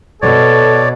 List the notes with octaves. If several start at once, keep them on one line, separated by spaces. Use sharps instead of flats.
B2 A4 C#5 D5